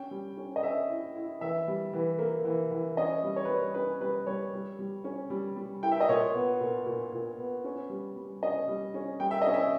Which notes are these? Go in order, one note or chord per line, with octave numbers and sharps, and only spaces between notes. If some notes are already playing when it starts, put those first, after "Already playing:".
Already playing: C#4 G5
G3
C#4
D#5
C#4 E5
E4
E4
E3 E5
G3
E3
A#3
E3
E3
C#4 D#5
G3
C#5
G3 B4
C#5
C#4 B4
G3 B4
G3 C#5
G3
G3
C#4
G3
G3
E4 G5
E5
D#5
A#2 C#5
B3
A#2
A#2
A#2
B3
C#4
G3
G3
C#4 D#5
G3
C#4
G3 G5
E5
D#5
C#4
E5